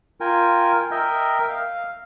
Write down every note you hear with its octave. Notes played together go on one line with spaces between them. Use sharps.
F4 A#4 G5 G#5
A#4 D#5 E5 G5
F5